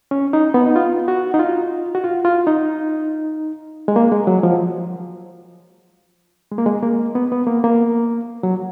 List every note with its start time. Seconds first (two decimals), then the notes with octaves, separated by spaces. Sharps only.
0.11 C#4
0.33 D#4
0.54 B3
0.66 D#4
0.76 F4
1.08 F#4
1.34 D#4
1.39 F4
1.95 F#4
2.04 F4
2.25 F4
2.47 D#4
3.88 G#3
3.96 A#3
4.12 G#3
4.27 F#3
4.43 F3
6.51 G#3
6.58 A#3
6.66 G#3
6.83 A#3
7.15 B3
7.32 B3
7.47 A#3
7.64 A#3
8.43 F#3